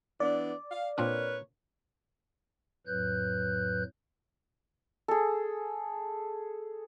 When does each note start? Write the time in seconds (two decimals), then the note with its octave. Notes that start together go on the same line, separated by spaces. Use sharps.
0.20 E3 B3 D4 D5
0.71 F5
0.98 A#2 C4 D4 A#4 B4 C#5
2.87 F2 A2 F#3 B4 F#6 G6
5.08 G#4 A4